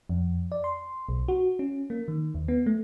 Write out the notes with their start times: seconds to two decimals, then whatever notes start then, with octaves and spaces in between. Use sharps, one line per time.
0.09 F2
0.52 D5
0.64 C6
1.09 B1
1.28 F#4
1.59 C#4
1.90 A#3
2.08 D#3
2.35 D#2
2.48 B3
2.66 A3